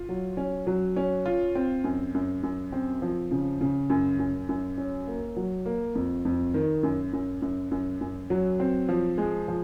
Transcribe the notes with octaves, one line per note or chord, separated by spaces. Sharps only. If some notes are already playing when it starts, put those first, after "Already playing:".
Already playing: F4
F#3
C#4
F#3
C#4
F4
C4
F#2
F#2
F#2
C4
F3
C#3
C#3
F#2
F#2
F#2
C#4
A#3
F#3
A#3
F2
F2
D#3
F#2
F#2
F#2
F#2
F#2
F#3
C4
F3
G#3
F3